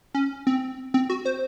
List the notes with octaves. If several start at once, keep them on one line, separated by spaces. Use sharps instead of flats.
C#4
C4
C4
F#4
C5